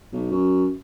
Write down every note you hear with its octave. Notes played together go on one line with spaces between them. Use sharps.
B1
F#2